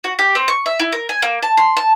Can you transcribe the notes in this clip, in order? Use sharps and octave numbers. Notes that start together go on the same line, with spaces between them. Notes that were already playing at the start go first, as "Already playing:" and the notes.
F#4
G4
C4
C#6
E5
E4
A#4
G#5
A#3
A5
C6
A5